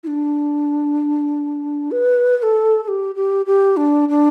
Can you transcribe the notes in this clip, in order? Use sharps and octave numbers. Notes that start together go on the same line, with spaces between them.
E4
D4
B4
B4
A4
A4
G4
G4
G4
D4
D4